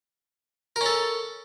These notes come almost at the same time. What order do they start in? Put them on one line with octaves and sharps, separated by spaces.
A#4 C#4 A4